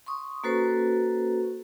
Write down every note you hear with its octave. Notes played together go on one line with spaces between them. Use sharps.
C6 C#6 D#6
A#3 C#4 F#4 A4 B4 C5